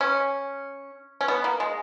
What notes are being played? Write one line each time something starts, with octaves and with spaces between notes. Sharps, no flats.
C#4
C#4
B3
A#3
G#3